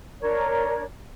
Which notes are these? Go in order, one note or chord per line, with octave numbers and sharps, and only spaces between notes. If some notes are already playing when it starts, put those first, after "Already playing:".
D4 A#4 C#5